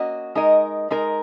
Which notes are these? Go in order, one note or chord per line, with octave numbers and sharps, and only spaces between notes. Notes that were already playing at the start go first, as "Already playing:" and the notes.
Already playing: A#3 C#4 F#4 D#5
G#3 D#4 A#4 D#5
G#3 D#4 A#4